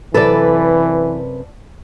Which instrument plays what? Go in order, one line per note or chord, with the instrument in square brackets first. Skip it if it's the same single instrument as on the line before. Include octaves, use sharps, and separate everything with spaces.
[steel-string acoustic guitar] F#2 C3 B4 [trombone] E3 [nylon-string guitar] A4 D5